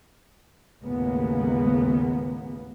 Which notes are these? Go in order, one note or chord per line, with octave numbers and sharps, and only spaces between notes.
A1 D#2 C#3 G#3 A#3 B3